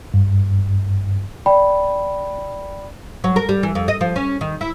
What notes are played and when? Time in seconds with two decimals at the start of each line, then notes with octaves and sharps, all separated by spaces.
0.14 G2
1.46 D5 G5 B5
3.24 F#3
3.36 A#4
3.49 G3
3.63 E3
3.75 F2
3.88 D#5
4.01 F3
4.16 C#4
4.41 D#3
4.61 E4